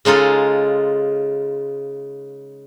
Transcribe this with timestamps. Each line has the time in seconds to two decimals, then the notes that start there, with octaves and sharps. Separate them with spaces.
0.05 C#3 G#3 D#4 F4 A4